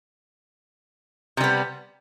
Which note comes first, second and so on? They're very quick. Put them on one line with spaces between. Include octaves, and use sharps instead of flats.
C3 G3 B3